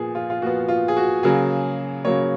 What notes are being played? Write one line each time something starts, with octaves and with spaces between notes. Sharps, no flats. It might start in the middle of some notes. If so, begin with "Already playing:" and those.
Already playing: A#2 F3 B3 G#4
F4
F4
A#2 F3 B3 F#4
F4
G#4
F#4
C#3 F#3 A#3 G#4
C#3 F#3 A#3 C#5